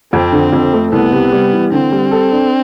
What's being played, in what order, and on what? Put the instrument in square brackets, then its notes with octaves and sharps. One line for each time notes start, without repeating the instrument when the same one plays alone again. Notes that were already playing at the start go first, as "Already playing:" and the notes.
[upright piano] F2 [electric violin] C4
[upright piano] D3
F2
A3
[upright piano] C2 [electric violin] B3
[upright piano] C3
G3
E3
[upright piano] D3 [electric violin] C4
[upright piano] G3
A4
D4